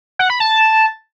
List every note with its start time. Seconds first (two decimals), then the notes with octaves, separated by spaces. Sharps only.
0.19 F#5
0.30 B5
0.40 A5